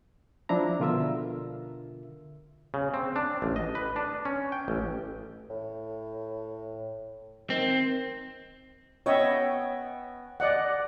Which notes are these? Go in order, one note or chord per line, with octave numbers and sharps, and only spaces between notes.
F3 D4 E4 A#5
B2 D3 F4 A#4 E5 E6
C#3
C4
D4
A1
D#5
B4
D4
C#4
G5
A1
A2
D#3 C4
B3 C#4 C#5 D#5 E5 G5
D5 D#5 F#5